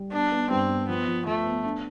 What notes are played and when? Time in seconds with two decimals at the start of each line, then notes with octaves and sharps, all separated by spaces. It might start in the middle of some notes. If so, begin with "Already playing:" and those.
Already playing: G3
0.12 B3 D4
0.32 B3
0.50 G2 C4
0.69 B3
0.88 F3 B3
1.08 F3
1.26 F3 A3
1.45 B3
1.65 D4